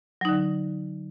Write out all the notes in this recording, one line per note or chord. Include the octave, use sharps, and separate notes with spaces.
D3 F#3 D#4